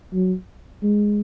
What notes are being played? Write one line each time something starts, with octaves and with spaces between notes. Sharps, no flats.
F#3
G#3